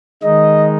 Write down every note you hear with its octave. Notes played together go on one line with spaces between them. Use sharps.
D#3 G#3 D#4 D#5